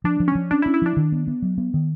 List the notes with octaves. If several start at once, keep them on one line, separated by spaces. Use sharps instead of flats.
F3 D4
F3
C#4
F3
C#4 D4
E4
C#4
E4
F3 D4
D#3
B3
B3
F#3
B3
D#3